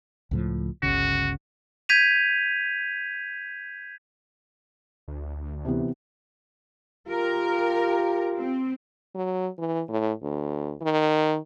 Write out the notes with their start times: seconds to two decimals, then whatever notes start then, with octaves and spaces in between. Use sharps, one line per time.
0.31 C#2 A2 F3
0.83 G1 C#2 C#3 F#4
1.89 G6 G#6 B6 D#7 F7
5.08 D2
5.65 C3 E3 B3
7.08 F4 G4 A#4
8.38 C4
9.15 F#3
9.59 E3
9.88 A2
10.23 D2
10.82 D#3